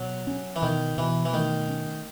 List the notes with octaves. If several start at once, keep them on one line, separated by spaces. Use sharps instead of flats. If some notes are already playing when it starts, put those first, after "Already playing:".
Already playing: B2 F#3
C#4
E3
B2 D#3
B2 E3
E3
D#3 A3
C#4